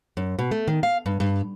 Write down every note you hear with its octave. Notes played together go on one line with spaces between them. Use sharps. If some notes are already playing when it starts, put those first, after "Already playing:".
F#2
B2
A3
D#3
F5
G2
G2